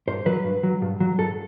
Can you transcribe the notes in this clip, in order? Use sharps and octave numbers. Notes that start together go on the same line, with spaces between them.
G2 C5
F#3 B4
G2
F#3
G2
F#3
G2 A4